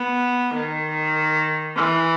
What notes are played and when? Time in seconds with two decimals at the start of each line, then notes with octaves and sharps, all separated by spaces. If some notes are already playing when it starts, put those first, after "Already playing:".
Already playing: B3
0.55 D#3
1.77 E3